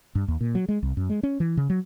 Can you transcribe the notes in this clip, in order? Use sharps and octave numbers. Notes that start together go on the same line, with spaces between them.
G2
D#2
A#2
F#3
G#3
C2
F#2
G#3
C#4
E3
C#3
F#3